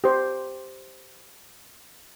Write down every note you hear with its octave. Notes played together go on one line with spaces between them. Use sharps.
G4 C5